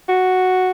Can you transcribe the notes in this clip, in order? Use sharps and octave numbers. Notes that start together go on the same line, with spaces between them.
F#4